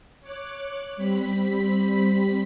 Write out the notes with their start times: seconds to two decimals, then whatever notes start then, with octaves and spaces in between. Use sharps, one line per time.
0.21 C#5 D6 F#6
0.96 G3 C4 B5 B6